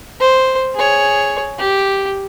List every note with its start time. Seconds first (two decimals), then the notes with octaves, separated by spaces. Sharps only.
0.20 C5
0.76 G#4 C#5
1.59 G4